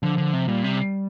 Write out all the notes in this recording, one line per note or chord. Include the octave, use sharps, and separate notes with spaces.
D3 F3
D3
C3
A#2 G3
C3